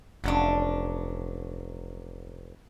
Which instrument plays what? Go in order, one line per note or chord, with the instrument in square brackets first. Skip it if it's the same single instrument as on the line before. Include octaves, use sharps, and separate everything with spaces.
[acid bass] F1 [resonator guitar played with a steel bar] F#3 C#4 D4